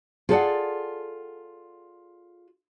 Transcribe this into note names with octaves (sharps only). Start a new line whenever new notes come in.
F4 G#4 A4 B4 D5 F#5